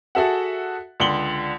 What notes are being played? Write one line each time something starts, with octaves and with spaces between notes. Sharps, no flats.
F#4 G#4 A4 E5 F#5
C#2 D3 C6 F#7 G7